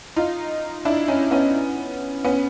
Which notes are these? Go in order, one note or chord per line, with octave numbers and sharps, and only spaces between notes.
D#4 F4
D4 E4
C#4 D#4
B3 C#4
B3 C#4